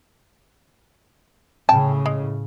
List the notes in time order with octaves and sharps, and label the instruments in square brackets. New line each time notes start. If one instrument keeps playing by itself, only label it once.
[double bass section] A2 C#3 [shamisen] G5 A5
[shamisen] G#3